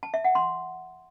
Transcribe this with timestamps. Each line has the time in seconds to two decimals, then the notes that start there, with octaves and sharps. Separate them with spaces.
0.03 A5
0.14 E5
0.24 F#5
0.35 C6